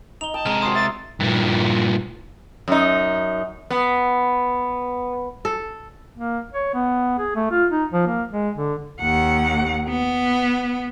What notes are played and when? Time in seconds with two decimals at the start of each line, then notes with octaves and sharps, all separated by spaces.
0.21 D#4 F7 G7
0.34 D#5 G5 A5
0.46 C3 G#3 A#5 F6
0.62 F#4 C5 C6 D#6 C7
0.75 F#4 E5 A6
1.21 G2 A#2
2.68 F#2 D#4
3.70 B3
5.45 A4
6.17 A#3
6.52 C#5
6.74 B3
7.18 G#4
7.36 A3
7.51 F4
7.71 D#4
7.93 F3
8.07 A#3
8.30 G#3
8.56 D3
9.01 D#2 F#5
9.89 B3